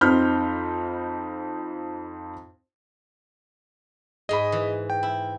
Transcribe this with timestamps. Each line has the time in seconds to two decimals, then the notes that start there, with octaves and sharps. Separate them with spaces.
0.01 F2 C4 D#4 B5 F6 G6
4.29 G#2 G#4 D#5 B5
4.52 E3
4.90 G5
5.03 E4